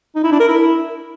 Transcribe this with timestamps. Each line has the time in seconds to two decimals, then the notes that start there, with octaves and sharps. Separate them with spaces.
0.16 D#4
0.24 E4
0.32 D4
0.40 A#4
0.48 E4